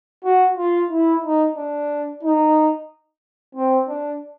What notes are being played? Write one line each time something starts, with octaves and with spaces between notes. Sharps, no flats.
F#4
F4
E4
D#4
D4
D#4
C4
D4